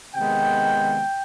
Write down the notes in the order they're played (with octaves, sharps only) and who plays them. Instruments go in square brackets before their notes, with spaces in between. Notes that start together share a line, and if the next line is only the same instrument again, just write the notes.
[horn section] C3 D#3 G#3 B3 G5